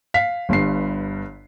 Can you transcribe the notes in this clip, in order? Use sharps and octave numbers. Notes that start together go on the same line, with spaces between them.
F5 B6
G1 G2 C7